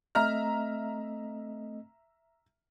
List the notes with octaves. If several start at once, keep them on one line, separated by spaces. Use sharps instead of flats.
A3 C4 D#5 E5 A#5 F6